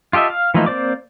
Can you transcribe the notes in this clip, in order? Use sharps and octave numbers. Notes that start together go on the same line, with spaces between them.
F4 G4 A4 D#5 E5
F5
E3 F3 A3 A#3 D#4
A#3 C4 C5 D5 D6